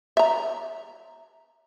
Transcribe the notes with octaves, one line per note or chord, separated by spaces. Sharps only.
E5 A#5